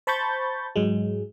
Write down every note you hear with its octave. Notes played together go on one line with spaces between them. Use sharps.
C5 A5 B5 C#6 G6 A6
G#2 F#3 G#3